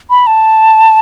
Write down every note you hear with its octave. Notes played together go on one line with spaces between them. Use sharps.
B5
A5